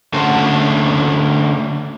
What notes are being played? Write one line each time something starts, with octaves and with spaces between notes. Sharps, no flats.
D3 A3 C#4 C5